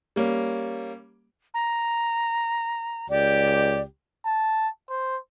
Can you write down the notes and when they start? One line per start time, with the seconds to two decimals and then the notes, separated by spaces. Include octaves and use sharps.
0.16 G3 A#3 C#4
1.54 A#5
3.10 C#2 G4 D5
4.25 A5
4.90 C5